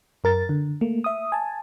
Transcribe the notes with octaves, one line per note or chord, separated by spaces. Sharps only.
F#2 A#4 A6
D3
A3 A#3
E5 D#6
G#5 A5